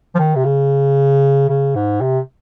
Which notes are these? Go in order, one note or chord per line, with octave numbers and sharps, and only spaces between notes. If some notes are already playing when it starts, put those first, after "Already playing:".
F3
D#3
C3
C#3
C#3
G#2
C3